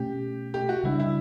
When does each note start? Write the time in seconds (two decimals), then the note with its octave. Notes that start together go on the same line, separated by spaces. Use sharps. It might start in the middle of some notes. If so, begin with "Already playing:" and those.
Already playing: B2 A3 C#4 G4
0.54 G4
0.69 F#4
0.84 C#3 G3 B3 D4 E4
0.99 E4